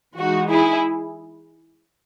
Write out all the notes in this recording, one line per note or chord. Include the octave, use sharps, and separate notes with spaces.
E3 G#3 D#4 F#4
E4 G#4